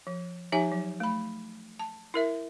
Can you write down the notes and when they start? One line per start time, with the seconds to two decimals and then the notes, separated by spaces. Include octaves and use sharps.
0.07 F3
0.52 F3 D#4 G4 E5 G#5
0.72 F#3
1.00 A3 B5
1.79 A5
2.14 E4 A#4 E5